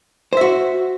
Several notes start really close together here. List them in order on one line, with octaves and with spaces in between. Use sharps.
C5 E5 F#4